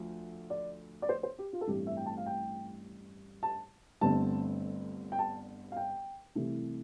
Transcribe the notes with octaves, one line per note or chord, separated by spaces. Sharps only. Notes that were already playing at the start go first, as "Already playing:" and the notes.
Already playing: D2 F3
D5
D5
C5
C5
G4
F4
A4
A1 G2 E3 A3 C4 G4
E5
G5
A5
F5
G5
A5
G1 G2 D3 A3 C4 A5
G5
A5
F5
G5
C2 C3 E3 A3